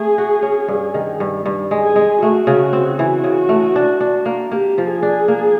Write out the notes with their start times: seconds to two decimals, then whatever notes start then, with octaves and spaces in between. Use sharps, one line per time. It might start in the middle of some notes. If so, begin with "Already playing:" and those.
Already playing: A3 G#4
0.18 F#4
0.42 C#4
0.68 G2
0.94 D#3
1.20 G2
1.46 G2
1.71 G#3
1.83 G#4
1.96 G#3
2.22 A3 F#4
2.47 C#3
2.73 C4
2.98 E3 F#4
3.24 C#3
3.49 A3
3.76 D4
4.00 D4
4.26 A#3
4.51 A#3 G4
4.78 F3
4.90 G#4
5.03 D4
5.28 A#3